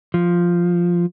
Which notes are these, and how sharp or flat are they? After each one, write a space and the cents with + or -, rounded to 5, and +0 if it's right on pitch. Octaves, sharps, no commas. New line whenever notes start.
F3 +0